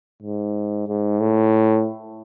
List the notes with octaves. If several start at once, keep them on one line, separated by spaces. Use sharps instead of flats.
G#2
G#2
A2